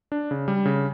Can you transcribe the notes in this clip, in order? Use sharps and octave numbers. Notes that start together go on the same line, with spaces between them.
D4
C#3
G3
C#3